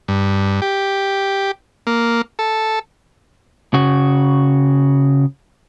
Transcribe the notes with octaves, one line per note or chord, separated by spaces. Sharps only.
G2
G4
A#3
A4
C#3 F#4